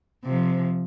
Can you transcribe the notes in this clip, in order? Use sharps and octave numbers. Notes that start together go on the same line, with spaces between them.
C3 F3